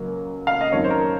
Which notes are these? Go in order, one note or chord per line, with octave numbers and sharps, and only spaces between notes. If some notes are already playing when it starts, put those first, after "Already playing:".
Already playing: C#2 F#3 A#3
F5
D#5
F2 D#3 F#3 C#4 C#5
C5
A#4